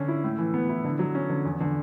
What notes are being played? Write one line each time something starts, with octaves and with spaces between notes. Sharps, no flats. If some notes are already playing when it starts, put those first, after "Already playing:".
Already playing: D3 C#4
E4
A2
E3
B3
E4
D3
F#3
C#4
D3
E2
D3